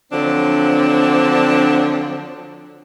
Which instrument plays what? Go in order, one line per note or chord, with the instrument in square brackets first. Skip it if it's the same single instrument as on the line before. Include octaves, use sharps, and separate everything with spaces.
[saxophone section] D3 F3 F#3 C4 D4